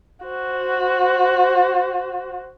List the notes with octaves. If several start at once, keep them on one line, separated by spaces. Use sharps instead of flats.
F#4 C5